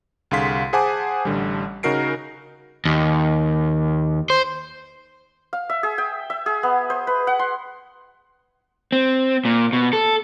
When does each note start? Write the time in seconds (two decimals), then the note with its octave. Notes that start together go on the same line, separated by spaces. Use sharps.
0.31 C2 D3 G#4 F5 C6 B6
0.73 G#4 C5 F#5 G#5 A5 D6
1.25 A1 D3 G3
1.83 C#3 D#4 F#4 A#4 C7 D7
2.85 D#2
4.30 C5
5.53 F5
5.70 E5
5.83 G#4
5.98 G5
6.30 E5
6.46 G#4
6.63 B3
6.90 C5
7.07 B4
7.27 F#5
7.39 C6
8.92 C4
9.45 A#2
9.73 B2
9.93 A4